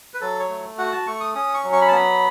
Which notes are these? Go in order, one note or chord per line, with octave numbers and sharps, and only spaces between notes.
B4
F#3 A4
C#5
A3
F#4 F#5
A5
A3 C#6
D#6
C#4 D#6
C#6
F#3
C#6
B5
A5
B3 B5